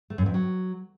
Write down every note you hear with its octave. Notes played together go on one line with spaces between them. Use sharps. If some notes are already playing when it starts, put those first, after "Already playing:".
A3
F#2
F2
F#3